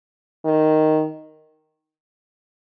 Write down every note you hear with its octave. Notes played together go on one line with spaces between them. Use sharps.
D#3